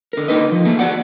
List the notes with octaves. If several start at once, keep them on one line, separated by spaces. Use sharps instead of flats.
D3 A#4
A#3 D#4 A#4 B4 D#5
F3
A3 A#3 G#4
F#4 D5 F#5